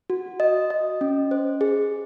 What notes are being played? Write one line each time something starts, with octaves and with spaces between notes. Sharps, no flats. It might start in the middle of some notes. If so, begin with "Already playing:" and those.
F#4
D#5
D#5
C#4
C5
G#4